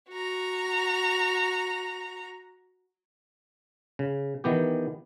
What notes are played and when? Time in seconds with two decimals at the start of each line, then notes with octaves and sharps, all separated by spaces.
0.11 F#4 A#5
3.99 C#3
4.44 D#3 E3 B3 G4